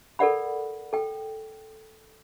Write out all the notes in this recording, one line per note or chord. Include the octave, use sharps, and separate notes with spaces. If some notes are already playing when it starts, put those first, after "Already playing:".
A4 A#4 D5 F#5 B5
A4 G5